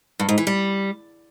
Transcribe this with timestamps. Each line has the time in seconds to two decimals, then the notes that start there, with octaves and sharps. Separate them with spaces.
0.20 G2
0.29 G#2
0.38 E3
0.47 G3